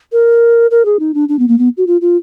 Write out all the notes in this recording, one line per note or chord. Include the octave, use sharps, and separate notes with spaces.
A#4
A#4
G#4
D#4
D4
D4
B3
A#3
B3
F#4
F4
F4